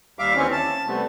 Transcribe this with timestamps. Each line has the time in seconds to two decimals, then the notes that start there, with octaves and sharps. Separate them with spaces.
0.19 D#2 G3 E5 F5 D6
0.36 D#2 E3 C4 C#4
0.52 A5
0.87 C3 G3 A3 B3